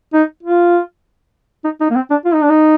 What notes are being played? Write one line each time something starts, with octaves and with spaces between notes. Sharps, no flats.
D#4
F4
D#4
D#4
A#3
C4
D4
F4
D#4
D4
D#4